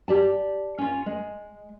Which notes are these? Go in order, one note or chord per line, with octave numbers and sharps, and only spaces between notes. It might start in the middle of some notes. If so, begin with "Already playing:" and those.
G4 D5 A5
C#4 F4
G#3